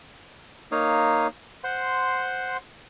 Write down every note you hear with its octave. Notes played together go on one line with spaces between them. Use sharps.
A#3 D#4 C#5 F5 D#6
C5 F#5 C6